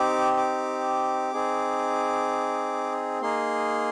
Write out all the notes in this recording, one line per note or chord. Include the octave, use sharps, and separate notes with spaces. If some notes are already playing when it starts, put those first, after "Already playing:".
Already playing: C4 D#4 G4 D6
D6
C4 D#4 G#4
A#3 D#4 G#4 C6